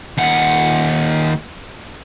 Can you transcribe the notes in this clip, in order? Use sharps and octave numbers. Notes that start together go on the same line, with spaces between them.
D#2 F#5